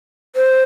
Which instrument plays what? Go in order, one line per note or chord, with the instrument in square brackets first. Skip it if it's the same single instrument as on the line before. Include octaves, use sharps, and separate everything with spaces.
[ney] C5